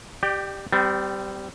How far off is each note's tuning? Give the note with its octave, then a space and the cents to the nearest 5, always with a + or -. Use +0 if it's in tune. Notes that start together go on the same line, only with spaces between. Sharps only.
G4 +0 D5 +30 G5 -25
G3 -10 C4 -35